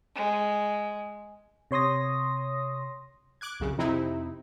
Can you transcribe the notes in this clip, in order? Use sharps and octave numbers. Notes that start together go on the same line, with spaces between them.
G#3
C3 C#5 C6 D#6 A#6
D6 F#6 G#6
C2 F#2 C#3
F2 C3 C4 D#4 E4